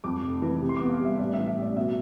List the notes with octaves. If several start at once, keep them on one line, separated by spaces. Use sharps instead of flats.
F2 D6
F1
E3
C3
C6
D6
B3
F5
G3
E5
A1 D5
E5
E3
E5
A1 D5
B2 E5